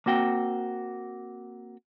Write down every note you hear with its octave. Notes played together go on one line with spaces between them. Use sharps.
A#3 C4 F#4 G5